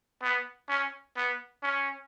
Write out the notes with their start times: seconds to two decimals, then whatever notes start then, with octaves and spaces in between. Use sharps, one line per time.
0.23 B3
0.69 C#4
1.17 B3
1.63 C#4